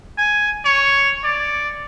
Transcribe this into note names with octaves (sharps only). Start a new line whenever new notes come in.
G#5
C#5
D5